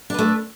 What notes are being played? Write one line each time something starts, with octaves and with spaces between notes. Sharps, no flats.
A3 D4 B4